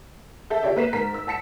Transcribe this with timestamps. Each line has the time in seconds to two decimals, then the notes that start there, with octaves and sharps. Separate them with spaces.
0.50 A4 E5 G6
0.63 F4 G4 A4 C#5 D5 E5
0.76 A#3 B4 B6 E7
0.93 G#2 A#4 B6
1.14 E6
1.27 F#5 A5 B6 C#7 E7